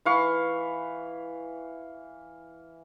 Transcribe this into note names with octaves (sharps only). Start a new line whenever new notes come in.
E3 F5 C#6